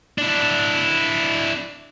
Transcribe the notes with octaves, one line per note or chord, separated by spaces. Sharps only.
D4 E4